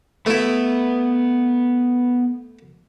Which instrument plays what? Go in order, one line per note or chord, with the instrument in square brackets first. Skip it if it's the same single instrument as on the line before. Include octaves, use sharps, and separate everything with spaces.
[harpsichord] A3 E4 [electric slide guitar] B3 B4